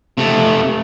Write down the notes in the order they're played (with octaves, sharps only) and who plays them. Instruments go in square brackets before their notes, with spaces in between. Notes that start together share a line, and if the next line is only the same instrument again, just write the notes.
[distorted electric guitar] C3 A3